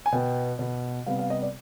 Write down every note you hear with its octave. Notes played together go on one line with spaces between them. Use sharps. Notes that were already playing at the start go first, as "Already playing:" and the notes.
G#5
B2 B3 G5
B2 B3
C3 G3 B3 F5
F5
D#5
D5